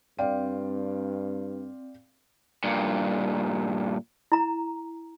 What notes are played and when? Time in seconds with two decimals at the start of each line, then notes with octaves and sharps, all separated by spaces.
0.19 G2 C4 D5 F5 G5
2.64 G2 A#2
4.32 E4 A#5